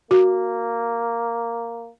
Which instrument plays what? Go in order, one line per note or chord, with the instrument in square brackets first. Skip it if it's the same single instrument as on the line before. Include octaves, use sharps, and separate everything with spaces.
[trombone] A#3 [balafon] F#4